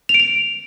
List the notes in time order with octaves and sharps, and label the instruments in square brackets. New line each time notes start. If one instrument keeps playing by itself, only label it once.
[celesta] F7
D7
F7